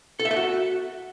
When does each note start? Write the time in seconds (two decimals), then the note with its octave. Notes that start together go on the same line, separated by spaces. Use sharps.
0.19 A4
0.25 E5
0.31 A4
0.36 F#4